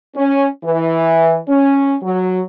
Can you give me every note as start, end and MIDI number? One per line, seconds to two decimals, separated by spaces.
0.15 0.45 61
0.64 1.38 52
1.49 1.96 61
2.02 2.41 54